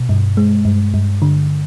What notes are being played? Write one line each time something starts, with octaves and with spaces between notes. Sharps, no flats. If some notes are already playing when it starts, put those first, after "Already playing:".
Already playing: B2
G2
G#3
G2
G2
D3